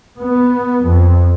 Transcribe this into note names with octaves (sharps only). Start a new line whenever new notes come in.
B3
F2